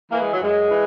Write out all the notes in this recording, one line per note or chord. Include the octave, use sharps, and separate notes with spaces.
E3 A#3
G#3
F#3
F#2 G#3
E3